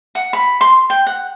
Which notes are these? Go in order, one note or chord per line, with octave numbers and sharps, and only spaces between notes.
F#5
B5
C6
G5
F#5